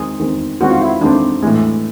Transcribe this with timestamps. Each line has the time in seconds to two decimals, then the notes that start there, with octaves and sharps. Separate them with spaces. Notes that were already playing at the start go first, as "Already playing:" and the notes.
Already playing: D#3 G#3 C4 G#4
0.20 D#3 G#3 C4
0.61 D#3 G#3 C4 F#4
0.70 F4
0.81 E4
1.01 D#3 G#3 C4 D4
1.43 A2 E3 G#3